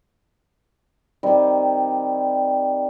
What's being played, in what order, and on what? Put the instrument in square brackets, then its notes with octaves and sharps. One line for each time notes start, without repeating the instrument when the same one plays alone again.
[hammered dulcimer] D#3 G3 C4